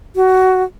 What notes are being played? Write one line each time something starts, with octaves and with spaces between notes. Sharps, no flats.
F#4